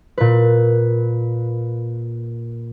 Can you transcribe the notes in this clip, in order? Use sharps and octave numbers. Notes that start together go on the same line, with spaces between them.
A#2 B4